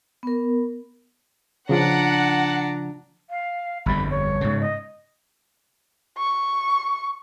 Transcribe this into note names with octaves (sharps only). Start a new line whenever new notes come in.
B3 A#4
C#3 F3 D4 F4 F#5 A#5
F5
G1 F2 G3 B5
C#5
G#2 C#3
D#5
C#6